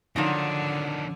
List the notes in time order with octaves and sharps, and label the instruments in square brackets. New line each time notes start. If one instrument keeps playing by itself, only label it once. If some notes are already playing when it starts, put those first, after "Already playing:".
[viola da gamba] D3 [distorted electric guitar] D#3 D4 [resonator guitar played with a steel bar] F3 F#3 D#4